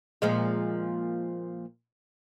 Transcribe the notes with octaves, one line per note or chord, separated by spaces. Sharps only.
A#2 F3 G#3